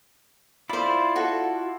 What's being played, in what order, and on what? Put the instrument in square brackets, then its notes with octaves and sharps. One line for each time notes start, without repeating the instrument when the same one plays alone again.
[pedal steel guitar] E4 F4 D5 [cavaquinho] C5 B5
[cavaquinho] F#4 A4